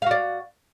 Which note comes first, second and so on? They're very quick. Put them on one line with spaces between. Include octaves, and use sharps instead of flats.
F5 F#4 D5